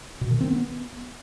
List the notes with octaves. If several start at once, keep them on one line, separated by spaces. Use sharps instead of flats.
B2
D#3
C4
B3